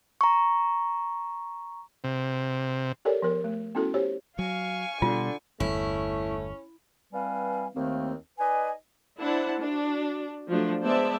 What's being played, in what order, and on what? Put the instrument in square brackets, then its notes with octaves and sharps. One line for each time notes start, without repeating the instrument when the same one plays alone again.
[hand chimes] A#5 C#6
[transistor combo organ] C3
[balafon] G4 A4 A#4 C#5 D5
F3 B3 A#4
A3
B3 C#4 E4 F#4 A4
G4 C5 C#5
[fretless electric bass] F#3 [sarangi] F5 [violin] G#5 C#6
[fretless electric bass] B2 G3 [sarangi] D3 [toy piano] F4
[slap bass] G1 E2 [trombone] A3 [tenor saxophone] C#4 [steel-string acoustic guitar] E4
[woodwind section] E3 G3 C4 B4 F5 G#5
D#2 D#3 A3 A#3 C4
D#4 B4 D5 D#5 G#5
[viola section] D4 E4 C5 F#5 A5
D4 F#4
F3 F#3 A3 D4
G#3 B3 C5 D5 E5 A5